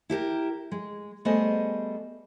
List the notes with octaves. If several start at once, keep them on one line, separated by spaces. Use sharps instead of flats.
E4 G4 A4 A#4
G#3
G3 A3 B3 G#4 C5 D#5